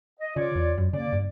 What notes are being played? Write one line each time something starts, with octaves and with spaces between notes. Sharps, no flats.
D#5
C#3 F4 C#5 D5
E2
F#2
C#3 A#3 D5
G2